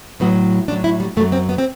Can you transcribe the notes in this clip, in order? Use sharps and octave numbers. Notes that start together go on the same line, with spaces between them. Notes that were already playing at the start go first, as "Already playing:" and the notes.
A2 F#3 B3
A2 F#3 D4
E4
G3
F#2 F#3 A3
C4
B3
C4